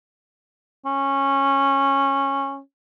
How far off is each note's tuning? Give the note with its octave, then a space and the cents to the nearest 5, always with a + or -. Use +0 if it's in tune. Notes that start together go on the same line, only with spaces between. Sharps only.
C#4 -15